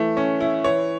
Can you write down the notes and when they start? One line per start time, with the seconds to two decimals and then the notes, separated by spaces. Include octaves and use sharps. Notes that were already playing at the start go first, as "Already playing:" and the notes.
Already playing: E3 A3
0.17 C#4
0.41 E4
0.64 E3 C#5